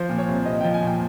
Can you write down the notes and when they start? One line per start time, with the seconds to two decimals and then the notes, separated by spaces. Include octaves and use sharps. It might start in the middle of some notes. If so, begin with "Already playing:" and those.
Already playing: F3 C5
0.09 A#2
0.18 C#5
0.28 C2
0.46 C2 D#5
0.61 F3 G5
0.74 G#5
0.83 A#2 G5